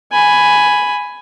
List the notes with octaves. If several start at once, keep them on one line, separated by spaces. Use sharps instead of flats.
G#5 B5